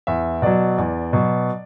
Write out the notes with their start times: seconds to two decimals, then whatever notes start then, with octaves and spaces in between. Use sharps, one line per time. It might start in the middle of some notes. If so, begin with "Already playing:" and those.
0.07 E2 E5
0.42 B2 F#3 D5
0.78 E2
1.13 B2 F#3